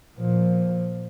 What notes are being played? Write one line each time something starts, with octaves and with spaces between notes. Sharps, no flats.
A#2 F3